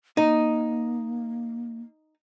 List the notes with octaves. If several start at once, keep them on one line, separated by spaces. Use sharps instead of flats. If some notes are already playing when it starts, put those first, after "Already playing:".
A#3 D#4